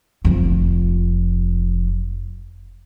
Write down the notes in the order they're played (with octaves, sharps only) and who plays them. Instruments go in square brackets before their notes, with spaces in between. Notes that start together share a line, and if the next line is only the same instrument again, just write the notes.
[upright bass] F1 F2